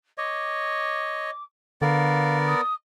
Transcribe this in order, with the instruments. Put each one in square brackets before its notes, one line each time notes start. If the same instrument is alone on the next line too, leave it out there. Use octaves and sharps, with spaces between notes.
[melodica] C#5 D#5 [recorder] D6
[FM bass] D3 [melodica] B3 A#4 D5 [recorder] F5
[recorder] D#6